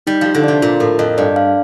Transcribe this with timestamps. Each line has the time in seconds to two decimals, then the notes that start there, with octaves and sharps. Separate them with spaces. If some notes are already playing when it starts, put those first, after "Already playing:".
0.07 G3 D#4
0.21 F3 G4
0.34 D3
0.44 C3 D5
0.62 A#2 F4
0.80 A2 A#4
0.99 F2 D#5
1.18 G2 D5
1.36 F5